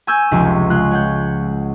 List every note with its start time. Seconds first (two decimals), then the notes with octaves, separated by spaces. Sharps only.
0.07 G#5 C#6 E6 G6 G#6
0.31 F1 C#2 F3 G4 C#6
0.70 G#3 F4 F#6
0.91 C#5 F#5 G6